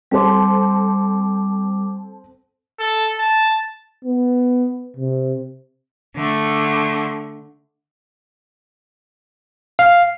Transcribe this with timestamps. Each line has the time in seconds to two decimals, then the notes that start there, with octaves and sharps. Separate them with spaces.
0.11 G3 C4 A4 C5 D6
2.79 A4
3.19 A5
4.05 B3
4.96 C3
6.15 D3 A3
9.79 F5